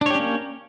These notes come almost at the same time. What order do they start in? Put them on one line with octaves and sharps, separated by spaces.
D4 C#5 G4 C#4 A#3